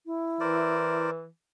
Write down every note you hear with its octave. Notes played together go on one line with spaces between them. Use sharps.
E4
E3 A#4 C5 D5